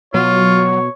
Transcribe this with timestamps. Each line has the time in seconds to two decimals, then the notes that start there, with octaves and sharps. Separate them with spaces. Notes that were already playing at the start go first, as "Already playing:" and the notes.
0.14 B2 F#3 F4 C#5